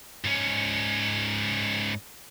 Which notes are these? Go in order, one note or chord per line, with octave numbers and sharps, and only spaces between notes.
G#2 C#4